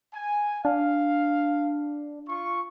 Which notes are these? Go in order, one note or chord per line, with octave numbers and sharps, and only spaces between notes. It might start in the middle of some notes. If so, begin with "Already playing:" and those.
G#5
D4 F5
F4 C#6